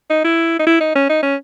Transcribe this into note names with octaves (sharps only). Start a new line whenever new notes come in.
D#4
E4
D#4
E4
D#4
C#4
D#4
C#4